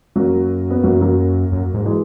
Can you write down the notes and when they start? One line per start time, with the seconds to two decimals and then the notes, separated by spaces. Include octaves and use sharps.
0.16 F#2 F#3 A#3
0.70 B3
0.83 F#2 F#3 A#3
1.01 F#3 A#3
1.52 F#2
1.74 G#2
1.85 E3 G#3